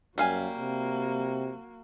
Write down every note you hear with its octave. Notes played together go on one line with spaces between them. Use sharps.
F#2 G3 A#3 F#4 F5 G#5
C3